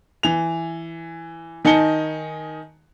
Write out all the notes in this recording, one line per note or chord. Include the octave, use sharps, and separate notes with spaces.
E3 F7
D#3 D#4 G#5 A5 C#7 G7